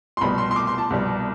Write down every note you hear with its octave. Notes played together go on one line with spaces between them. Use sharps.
C6
C2 B2 G3 B5
C6
C6
D6
C6
A5
C2 B2 G3